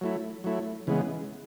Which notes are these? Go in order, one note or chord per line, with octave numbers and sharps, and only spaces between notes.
F#3 A3 E4
F#3 A3 E4
C#3 E3 G#3 B3